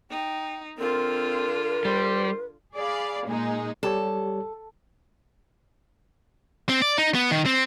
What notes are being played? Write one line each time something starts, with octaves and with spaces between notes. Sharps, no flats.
D#4 G5
D3 C4 F4 A#4
G3 C5
G#4 D5 F5 B5
A#2 G#3 D#4 G#4
G3 G4 A4 C#5
C4
D5
D#4
B3
D#3
C4